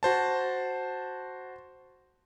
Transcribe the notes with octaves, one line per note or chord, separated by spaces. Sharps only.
F#4 C5 A5